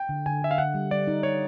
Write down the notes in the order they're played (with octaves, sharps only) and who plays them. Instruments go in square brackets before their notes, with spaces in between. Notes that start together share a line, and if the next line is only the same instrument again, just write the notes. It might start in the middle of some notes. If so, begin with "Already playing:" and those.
Already playing: [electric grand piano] G5
[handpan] D3
[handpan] D3 [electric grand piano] G#5
[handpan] D3 [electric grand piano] E5
[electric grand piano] F5
[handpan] D3 [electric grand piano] F#5
[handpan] G3
[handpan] G3 [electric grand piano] D5
[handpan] D#4
[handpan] G3 [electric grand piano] C#5